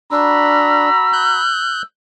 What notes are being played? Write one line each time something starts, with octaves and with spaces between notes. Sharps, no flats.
D4 F#4 A#5 B5 E6
F#6 G6